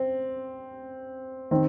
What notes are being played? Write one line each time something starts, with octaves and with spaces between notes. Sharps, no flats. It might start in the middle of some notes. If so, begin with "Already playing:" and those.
Already playing: C4
D#3 C4